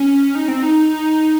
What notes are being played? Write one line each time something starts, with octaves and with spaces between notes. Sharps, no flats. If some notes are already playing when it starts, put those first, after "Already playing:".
Already playing: C#4
D#4
C4
D#4